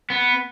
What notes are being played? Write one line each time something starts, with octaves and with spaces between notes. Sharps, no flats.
B3